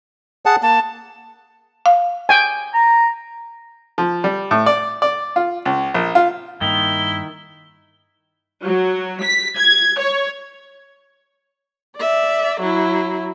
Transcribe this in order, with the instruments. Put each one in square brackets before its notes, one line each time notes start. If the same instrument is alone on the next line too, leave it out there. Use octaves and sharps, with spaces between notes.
[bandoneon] G#4 F#5 A5
[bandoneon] A#3 [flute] A5
[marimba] F5
[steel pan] G5 G#5
[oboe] A#5
[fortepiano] F3
G3
A2
D5
D5
F4
C#2
A#1
F4
[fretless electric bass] G2 A#3 [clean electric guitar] D#3 [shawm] E4 [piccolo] G7
[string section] F#3
B6
G#6
C#5
[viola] D5 E5
F#3 E4